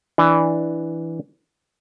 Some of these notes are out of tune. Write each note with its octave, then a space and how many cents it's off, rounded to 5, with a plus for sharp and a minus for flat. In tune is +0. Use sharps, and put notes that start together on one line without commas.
E3 +0 D4 +5